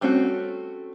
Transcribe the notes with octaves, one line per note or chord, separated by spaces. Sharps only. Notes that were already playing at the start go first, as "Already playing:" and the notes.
G3 A3 C4 C#4 F#4